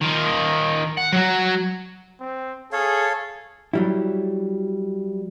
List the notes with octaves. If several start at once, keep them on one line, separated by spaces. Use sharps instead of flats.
D#3 F4
F#5
F#3 F#4
C4
G#4 A4 C#5 F5
F#3 G3 E4